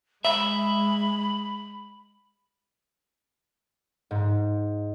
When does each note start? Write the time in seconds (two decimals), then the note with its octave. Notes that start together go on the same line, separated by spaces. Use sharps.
0.25 G#3 E5 B5
4.11 G#2